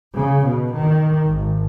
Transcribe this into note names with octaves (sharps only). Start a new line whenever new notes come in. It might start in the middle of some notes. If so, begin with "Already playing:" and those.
C#3
B2
D#3
G#1